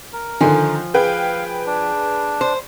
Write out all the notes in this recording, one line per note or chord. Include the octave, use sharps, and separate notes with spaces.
A#4
D3 D#3 F3 G#5
G#4 B4 F5 G5
D4
C5